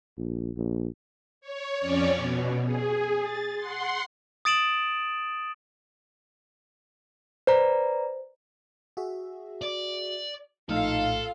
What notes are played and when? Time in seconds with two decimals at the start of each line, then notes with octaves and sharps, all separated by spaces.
0.18 A#1
0.57 A#1
1.41 C#5
1.79 F2 C#4 C#5 D5
2.13 B2
2.65 G#4
3.20 A6
3.56 F#5 C6
4.45 D#6 A6 D7 E7 F#7
7.47 B4 C5 D5 A#5
8.97 F#4 G#4 E5
9.62 D5
10.69 A#1 A2 D#4 F4 A4 F5 F6